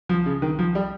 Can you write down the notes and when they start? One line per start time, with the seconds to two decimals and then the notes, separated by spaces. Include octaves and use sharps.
0.09 F3
0.26 C#3
0.42 D#3
0.59 F3
0.75 G3